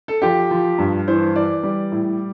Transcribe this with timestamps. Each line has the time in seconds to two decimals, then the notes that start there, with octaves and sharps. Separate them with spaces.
0.08 A4
0.22 F3 G4
0.51 F3
0.78 G2
1.08 E3 C5
1.35 E3 D5
1.63 G3
1.92 A2